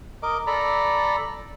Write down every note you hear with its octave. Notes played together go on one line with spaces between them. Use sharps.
A#4 D#5 D6
A4 D5 A#5 B5